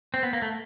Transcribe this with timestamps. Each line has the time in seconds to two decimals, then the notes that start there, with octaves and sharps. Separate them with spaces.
0.14 C4
0.23 B3
0.33 A#3
0.42 A3